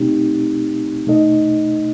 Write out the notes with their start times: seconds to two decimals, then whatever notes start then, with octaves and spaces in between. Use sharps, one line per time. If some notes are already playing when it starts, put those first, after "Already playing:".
Already playing: B2 A3 C4 D#4 G4
1.06 B2 A3 D#4 A4 D#5